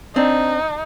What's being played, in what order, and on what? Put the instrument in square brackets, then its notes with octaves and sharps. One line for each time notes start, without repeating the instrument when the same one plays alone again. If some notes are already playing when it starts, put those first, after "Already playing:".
[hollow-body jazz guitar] C4 D4 [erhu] D#4